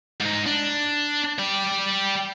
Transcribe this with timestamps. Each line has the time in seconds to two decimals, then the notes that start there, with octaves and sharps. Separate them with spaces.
0.21 G#2 D#4
0.46 D4
1.39 G4 D5